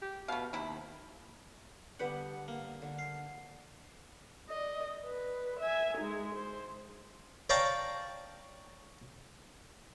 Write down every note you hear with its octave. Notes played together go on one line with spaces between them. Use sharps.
G4
B2 A3 F5
D#2 C3 E4
D3 G3 B3 G4 B4 F#5
A#3
D3
F5
D5 D#5
B4
E5 G#5
G#3 D#4
C5
C#5 D5 F5 G5 A5 A#5